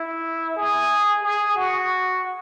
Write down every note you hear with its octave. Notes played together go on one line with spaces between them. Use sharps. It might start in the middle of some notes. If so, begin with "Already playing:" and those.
Already playing: E4
G#4
G#4
F#4